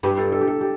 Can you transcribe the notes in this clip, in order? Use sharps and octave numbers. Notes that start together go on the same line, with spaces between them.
G2 G4
A4
A4
G4
A4
G4